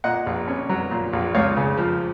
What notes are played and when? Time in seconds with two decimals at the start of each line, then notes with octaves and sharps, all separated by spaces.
0.04 A#2 D#5 F#5
0.26 A#1
0.48 C#4
0.69 F#3
0.91 A#2
1.13 A#1
1.35 C#2 C#5 F5
1.57 C#3
1.77 F3